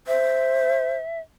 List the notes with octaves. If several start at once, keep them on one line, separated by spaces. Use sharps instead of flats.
C5 E5